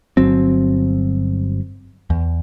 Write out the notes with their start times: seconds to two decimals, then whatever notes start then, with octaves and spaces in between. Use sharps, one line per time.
0.17 G1 F#3 C4
2.10 E2